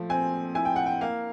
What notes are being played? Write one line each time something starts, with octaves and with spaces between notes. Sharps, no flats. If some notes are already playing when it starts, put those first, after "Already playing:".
Already playing: F3 A3
C4 G#5
E4 G#5
G5
F#5
G5
A#3 F5